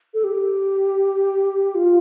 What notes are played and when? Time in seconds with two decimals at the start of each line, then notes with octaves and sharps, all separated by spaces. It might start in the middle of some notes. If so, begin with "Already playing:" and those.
0.14 A4
0.24 G4
1.75 F4